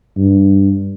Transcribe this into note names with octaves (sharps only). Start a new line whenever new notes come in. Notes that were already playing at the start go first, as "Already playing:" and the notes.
G2